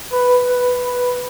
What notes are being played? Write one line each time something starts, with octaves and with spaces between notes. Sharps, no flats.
B4
B4
B4